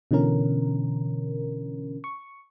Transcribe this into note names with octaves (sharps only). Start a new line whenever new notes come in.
B2 D3 E3 C#4 A#4
C#6